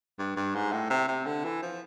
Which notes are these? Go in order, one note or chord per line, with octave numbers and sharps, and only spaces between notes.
G2
G2
G#2
A2
C3
C3
D3
E3
F3